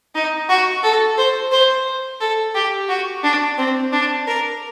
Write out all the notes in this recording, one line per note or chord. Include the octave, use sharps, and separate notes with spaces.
D#4
F#4
A4
C5
C5
A4
G4
F#4
D4
C4
D4
A#4